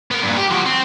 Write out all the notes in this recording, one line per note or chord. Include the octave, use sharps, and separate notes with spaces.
B3 A#4
G2 A#2
G4
F3 F#4
C4